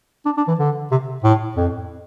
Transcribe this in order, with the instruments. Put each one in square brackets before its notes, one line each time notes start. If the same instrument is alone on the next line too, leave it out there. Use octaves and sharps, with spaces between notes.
[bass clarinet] D4
D4
E3
D3
C3
A2
F2